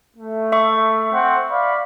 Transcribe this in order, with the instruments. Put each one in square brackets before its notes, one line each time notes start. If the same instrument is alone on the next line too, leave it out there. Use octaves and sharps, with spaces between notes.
[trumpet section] A3
[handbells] E5 C#6
[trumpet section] C4 F#5 C6
D5 F5 B5